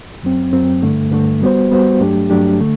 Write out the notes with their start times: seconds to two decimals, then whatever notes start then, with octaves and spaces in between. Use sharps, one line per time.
0.23 F#2 F#3 C4
0.53 F#2 F#3 C4
0.83 G2 D3 A3
1.12 G2 D3 A3
1.42 G3 B3 F#4 C5
1.71 G3 B3 F#4 C5
2.00 G2 F#3 A3 D4 G4
2.30 G2 F#3 A3 D4 G4
2.60 D3 A3